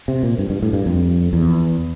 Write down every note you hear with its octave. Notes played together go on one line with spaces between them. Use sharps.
C3
A#2
G2
G2
A2
G2
F2
E2